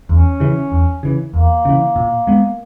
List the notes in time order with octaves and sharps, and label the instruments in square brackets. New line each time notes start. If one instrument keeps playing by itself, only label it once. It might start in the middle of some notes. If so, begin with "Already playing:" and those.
[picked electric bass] E2 [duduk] C#4
[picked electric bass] C#3 E3
E2
C#3 E3
[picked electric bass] E2 [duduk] A#3
[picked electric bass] C#3 E3
A#2
G#3 B3